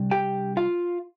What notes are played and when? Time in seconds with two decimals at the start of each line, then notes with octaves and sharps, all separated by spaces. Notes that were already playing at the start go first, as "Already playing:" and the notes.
Already playing: C3 G3 D4
0.11 G4 G5
0.57 F4 F5